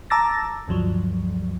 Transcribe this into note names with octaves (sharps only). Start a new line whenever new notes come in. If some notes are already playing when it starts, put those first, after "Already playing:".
A5 A#5 D6 E6 A6 A#6
D2 G2 F3 F#3